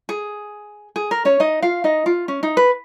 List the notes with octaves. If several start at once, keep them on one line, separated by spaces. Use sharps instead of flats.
G#4
G#4
A#4
C#4 C#5
D#4 D#5
F4 F5
D#4 D#5
F4
C#4
D#4
B4